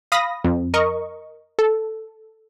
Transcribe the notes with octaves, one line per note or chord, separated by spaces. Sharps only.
F5 B5 D#6 A#6
F2
A#4 D#5 C#6
A4